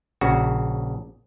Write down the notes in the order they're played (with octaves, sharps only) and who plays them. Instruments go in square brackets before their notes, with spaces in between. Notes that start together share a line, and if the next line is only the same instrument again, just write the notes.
[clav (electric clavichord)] A#1 C#3 F#4